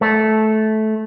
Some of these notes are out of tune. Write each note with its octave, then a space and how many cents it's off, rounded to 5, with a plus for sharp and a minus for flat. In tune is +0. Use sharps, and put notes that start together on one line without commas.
A3 -15